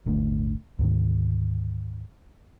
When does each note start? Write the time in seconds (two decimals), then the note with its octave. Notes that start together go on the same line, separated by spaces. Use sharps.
0.06 D#1 G#1 D3 A3
0.79 D2 G#2 D#3